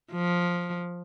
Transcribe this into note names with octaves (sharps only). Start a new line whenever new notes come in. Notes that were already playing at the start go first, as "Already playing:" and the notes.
F3